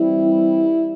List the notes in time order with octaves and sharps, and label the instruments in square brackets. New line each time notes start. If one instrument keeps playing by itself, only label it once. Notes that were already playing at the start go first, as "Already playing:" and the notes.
Already playing: [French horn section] E3 G3 C4 E4